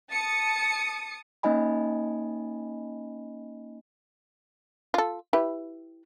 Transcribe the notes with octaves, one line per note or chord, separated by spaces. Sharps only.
A5 D#6 C#7
A#3 C#4 D#4 D#5 G#5 B5
F4 A4
E4 G4 B4